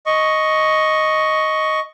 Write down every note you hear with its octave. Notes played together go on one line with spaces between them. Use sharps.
D#5 C#6